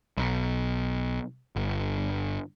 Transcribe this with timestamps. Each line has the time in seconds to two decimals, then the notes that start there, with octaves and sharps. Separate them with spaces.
0.17 B1
1.56 G1